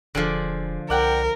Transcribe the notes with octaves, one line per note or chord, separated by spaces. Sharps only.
E1 D3 F3 F4 G#4 D5
C2 A#4 D5 F#5 G5